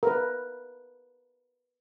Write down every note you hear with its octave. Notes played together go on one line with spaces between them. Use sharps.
A#4 B4